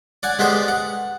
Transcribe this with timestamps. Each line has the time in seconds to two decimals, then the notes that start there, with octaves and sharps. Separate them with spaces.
0.23 D5 F#5 G#5
0.39 G#3 B3 G4 A4 C5 D5
0.68 F#5